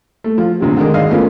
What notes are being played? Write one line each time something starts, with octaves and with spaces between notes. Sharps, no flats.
A3
F3
D2 C3 F#3
D3 D#3 G#3
G#1 D4 D#5 F5
A3 B3 C#4 F4 A#4